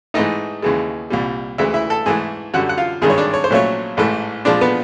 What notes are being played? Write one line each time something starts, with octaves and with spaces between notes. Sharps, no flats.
G#2 E3 A3 D#4 D#5
D#2 C#3 E3 G#3
C2 A#2 G3
D2 C#3 E3 G#3 E4 E5
E4 E5
A4 A5
G#2 E3 A3 G#4 G#5
F#2 D3 G3 F#4 F#5
F#5
F4 F5
G#1 G2 D#3 G#3 G#4 G#5
C#5
D4 D5
C#5
C5
A#1 A#2 F#3 A3 C#4 C#5
A1 G#2 E3 A3
A#1 A#2 F3 G#3 D4 D5
B3 B4